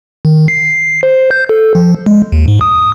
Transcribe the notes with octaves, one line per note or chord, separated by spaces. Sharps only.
D#3
C7
C5
G6
A4
F3
G#3
D#2
G#2
D#6